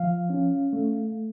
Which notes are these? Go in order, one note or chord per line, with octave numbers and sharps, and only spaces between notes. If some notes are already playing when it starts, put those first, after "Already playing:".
Already playing: F3 F5
C#4
A3